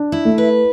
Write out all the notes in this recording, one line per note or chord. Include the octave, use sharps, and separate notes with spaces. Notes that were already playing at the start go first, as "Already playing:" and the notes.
Already playing: D4
E4
A3
B4